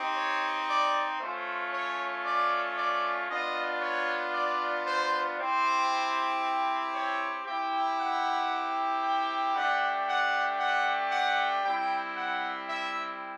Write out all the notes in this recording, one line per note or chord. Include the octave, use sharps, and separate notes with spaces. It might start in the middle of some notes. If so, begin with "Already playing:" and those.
Already playing: C4 D#4 G4
C#5
D5
A3 C#4 F4 C5
C#5
D5
D5
B3 D4 F4 D#5
C#5
D5
C5
C4 E4 G4 C5
C#5
C4 E4 G4 G5
F#5
G5
A3 D4 G4 F#5
F#5
F#5
F#5
G3 C4 E4 G5
F#5
E5